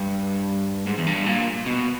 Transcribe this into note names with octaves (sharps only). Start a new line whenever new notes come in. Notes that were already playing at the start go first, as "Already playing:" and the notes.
Already playing: G2
G#2
E2
G2
A#2
B2